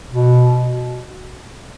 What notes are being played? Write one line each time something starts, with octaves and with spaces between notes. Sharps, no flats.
B2